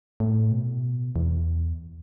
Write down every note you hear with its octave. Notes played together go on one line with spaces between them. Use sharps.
A2
B2
E2